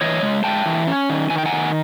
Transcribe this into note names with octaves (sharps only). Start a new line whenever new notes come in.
E3 C#5 D#5
G#3
G#3 G5 A5
E3
C#4
D#3
D#3 G#5
G5
F#5 G#5
D#3